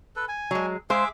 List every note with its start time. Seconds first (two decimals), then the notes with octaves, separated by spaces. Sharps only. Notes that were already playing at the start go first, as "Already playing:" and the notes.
0.16 A4 B4
0.28 G#5
0.51 F#3 G#3
0.90 G#3 G#4 C5 E5 F5 D6